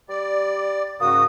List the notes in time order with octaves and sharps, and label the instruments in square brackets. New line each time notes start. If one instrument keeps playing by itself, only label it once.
[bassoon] G3 [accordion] D5
[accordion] G#2 C#3 F#4 [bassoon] A#3 [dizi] D#6